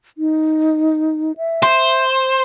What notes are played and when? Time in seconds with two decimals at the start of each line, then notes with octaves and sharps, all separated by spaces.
0.18 D#4
1.37 E5
1.63 C5